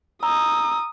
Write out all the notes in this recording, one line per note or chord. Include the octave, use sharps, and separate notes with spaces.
A#5 D#6 E6